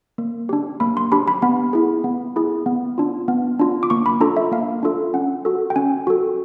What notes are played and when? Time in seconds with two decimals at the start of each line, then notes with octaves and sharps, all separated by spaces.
0.18 A#3
0.49 D4 G4
0.80 A#3 B5
0.97 C6
1.12 D4 G4 B5
1.28 B5
1.42 B3 B5
1.73 E4 G#4
2.04 B3
2.36 E4 G#4
2.66 B3
2.98 D4 F4
3.28 B3
3.59 D4 F4
3.83 D6
3.90 A#3 C#6
4.06 B5
4.21 D4 F4 A4 A#5
4.37 E5
4.52 A#3 F5
4.83 D4 F4 A4
5.14 C#4 F#5
5.45 F#4 A4
5.70 G5
5.76 C#4 G#5
6.07 F#4 A4